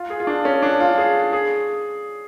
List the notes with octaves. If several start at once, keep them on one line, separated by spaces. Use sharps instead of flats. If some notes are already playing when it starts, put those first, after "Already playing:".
Already playing: F4
G#4
F4
D4
C#4
D4
F4
G#4
G#4